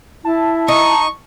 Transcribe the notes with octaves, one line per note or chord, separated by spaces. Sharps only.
E4 A5
D#4 C#6